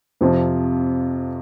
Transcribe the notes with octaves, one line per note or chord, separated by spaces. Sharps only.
F2 C3 F3